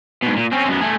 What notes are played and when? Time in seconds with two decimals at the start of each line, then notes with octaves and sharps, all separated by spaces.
0.23 G#2 B2
0.36 A#2
0.52 C4 C#4
0.68 F#2 B3
0.81 A3 G#4